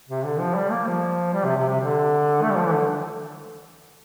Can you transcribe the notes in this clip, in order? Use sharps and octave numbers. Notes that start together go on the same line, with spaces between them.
C3
D3
F3
G3
A#3
F3
G3
C3
C3
C3
D3
A3
G3
F3
E3
D3